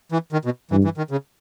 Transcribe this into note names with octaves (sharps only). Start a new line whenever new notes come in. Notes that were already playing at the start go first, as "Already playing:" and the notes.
E3
D#3
B2
G2 E3
E3
D#3
C#3